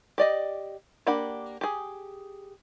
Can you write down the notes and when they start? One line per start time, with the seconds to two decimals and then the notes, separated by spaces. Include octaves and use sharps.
0.18 G4 D5 D#5
1.07 A#3 D4 G4 F#5 B5
1.61 G4 G#4